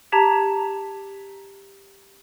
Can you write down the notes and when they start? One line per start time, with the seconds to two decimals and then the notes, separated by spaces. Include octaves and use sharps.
0.12 G4 A5 A#5 G#6 B6